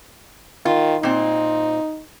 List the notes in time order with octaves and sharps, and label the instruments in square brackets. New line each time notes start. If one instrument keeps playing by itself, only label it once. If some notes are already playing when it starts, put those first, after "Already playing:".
[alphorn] D#3 [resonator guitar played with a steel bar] F4
[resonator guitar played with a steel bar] A#2 C4 [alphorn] D#4